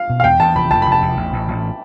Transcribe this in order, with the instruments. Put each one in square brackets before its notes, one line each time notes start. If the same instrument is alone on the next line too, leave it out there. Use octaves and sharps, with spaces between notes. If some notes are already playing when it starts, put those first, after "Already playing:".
Already playing: [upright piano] F5
[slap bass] B2
[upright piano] F5
[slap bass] E2 [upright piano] G5
[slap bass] E2 [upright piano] A5
[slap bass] F1 [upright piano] B5
[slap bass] F1 [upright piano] A5
[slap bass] F1 [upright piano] B5
[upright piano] A5
[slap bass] E2
A1
A1
A1